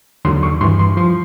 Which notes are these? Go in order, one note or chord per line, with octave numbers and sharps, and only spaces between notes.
D#2 D3 F#3 C6
C#6
G2 E3 C6
C6
F3 C6